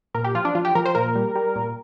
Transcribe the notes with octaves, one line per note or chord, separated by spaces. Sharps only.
A#2 A#4
G4
F3 F4
D4
F3 F4
G4
F3 A#4
C5
A#2 A#4
G3
G3
A#2